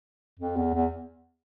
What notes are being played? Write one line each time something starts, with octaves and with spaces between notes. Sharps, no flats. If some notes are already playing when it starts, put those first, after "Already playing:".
F2
E2
E2